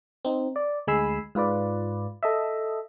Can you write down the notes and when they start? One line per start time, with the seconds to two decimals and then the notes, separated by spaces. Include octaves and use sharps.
0.25 C4 D#4
0.56 D5
0.87 D2 G#3 G#5 B5 E6 C7
1.35 G#2 F4 B4 D5
2.23 A4 D#5 E5